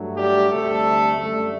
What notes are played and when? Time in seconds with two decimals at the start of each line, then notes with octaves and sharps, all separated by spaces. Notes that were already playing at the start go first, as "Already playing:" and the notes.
Already playing: G2 F#3 A3
0.15 G3 G4
0.49 D2 C3 G3 A3 A4
1.17 F#2 D3 G3 A3 A4